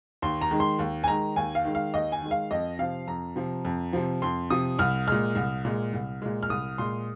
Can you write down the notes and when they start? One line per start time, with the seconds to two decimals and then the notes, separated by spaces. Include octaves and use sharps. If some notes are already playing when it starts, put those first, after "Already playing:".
0.22 D#2 C6
0.41 A#5
0.51 D#3 G#3
0.60 C6
0.79 D#2
1.04 G#5
1.08 D#3 G#3 A#5
1.36 D#2 G#5
1.55 F5
1.65 D#3 G#3
1.75 F5
1.94 D#2 D#5
2.12 G#5
2.22 D#3 G#3
2.31 F5
2.51 F2 D#5
2.79 C3 F3 F5
3.07 F2 A#5
3.36 C3 F3
3.65 F2
3.93 C3 F3
4.22 F2 C6
4.50 C3 F3 D#6
4.79 C2 F6
5.07 A#2 G#3 F6
5.35 C2
5.65 A#2 G#3
5.93 C2
6.22 A#2 G#3
6.43 F6
6.49 C2 D#6
6.78 A#2 G#3 C6